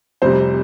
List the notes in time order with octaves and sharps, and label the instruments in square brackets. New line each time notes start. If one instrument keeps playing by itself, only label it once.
[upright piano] F1 F2 C3 G3 C5